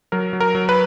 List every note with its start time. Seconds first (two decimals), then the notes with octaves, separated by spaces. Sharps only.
0.12 F#3 A#4
0.33 F#3
0.40 A#4
0.55 F#3
0.69 B4